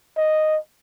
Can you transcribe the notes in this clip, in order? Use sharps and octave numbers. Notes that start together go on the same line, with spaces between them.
D#5